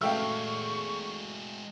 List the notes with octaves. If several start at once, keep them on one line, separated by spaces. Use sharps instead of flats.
G#3 A3 D4 F#4 F5 G5 C#6 E6